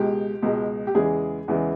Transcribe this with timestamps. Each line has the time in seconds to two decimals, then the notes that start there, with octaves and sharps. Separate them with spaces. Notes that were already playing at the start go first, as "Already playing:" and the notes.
Already playing: C#2 B2 G#3 G4
0.42 C#2 B2 G#3
0.87 G4
0.94 E2 C#3 E3 G#3 G#4
1.48 E2 C#3 E3 G#3